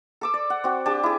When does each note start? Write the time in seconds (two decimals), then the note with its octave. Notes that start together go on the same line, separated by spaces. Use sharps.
0.21 A4 D6 E6
0.34 D5
0.50 F#5
0.64 C4 F#4
0.86 D4 G4 D5 A5
1.03 E4 G#4